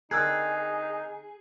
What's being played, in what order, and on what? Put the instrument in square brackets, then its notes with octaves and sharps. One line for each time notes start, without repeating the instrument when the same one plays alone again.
[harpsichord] D3 C4 A#4 [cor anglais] D#4 [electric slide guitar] G#4 [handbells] E6 F#6 G#6